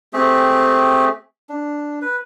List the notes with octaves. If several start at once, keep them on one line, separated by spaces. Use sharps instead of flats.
A3 C4 G4 G#4
D4
B4